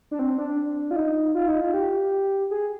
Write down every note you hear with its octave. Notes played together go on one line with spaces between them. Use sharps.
D4
C4
D4
F4
D#4
F4
D#4
F4
G4
G#4